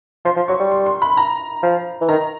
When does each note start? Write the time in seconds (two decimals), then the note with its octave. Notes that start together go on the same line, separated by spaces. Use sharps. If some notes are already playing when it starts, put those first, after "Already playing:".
0.25 F3 C6
0.36 F3
0.48 F#3 C#6
0.59 G3
0.71 C6
0.86 C6
1.02 B5
1.17 A#5
1.63 F3
2.01 E3
2.09 D#3 A#5